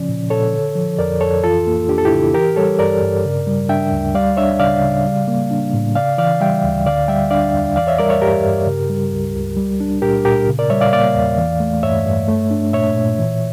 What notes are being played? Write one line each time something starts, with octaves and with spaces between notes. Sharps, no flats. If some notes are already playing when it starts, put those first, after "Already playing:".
Already playing: C#3 F3 C#4 D5
A#2
A#2 A4 C#5
D3
F3
F2 A#4 D5
F2 A4 C#5
E3 F4 A4
A#3
D4 G4
A4
E4 G4
C#3
E3 G4 A#4
G3 A4 C#5
G2 A#4 D5
G2
C#3
G3
D4 E5 G5
D2
G3 D5 F5
D4 C#5 E5
C#3 D5 F5
C#3
G3
A#3
D4
A2
C#3 D5 F5
E3 D5 F5
G3 E5 G5
D2
D3 D5 F5
G3 E5 G5
D4 D5 F5
E2
E3 D5 F5
C#5 E5
G3 A#4 D5
C#5 E5
G2 G4 A#4
G2
C#3
G3
C#2
C#2
G3
D4
A#2 G4 A#4
A#2 G4 A#4
C#3
A#4 D5
G3 C#5 E5
D5 F5
A#3 D5 F5
E2
E3
A3
G2 C#5 E5
G2
A3
D4
A#2 C#5 E5
A#2
E3